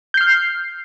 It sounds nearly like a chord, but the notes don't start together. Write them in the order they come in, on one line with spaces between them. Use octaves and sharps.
G6 C7 F6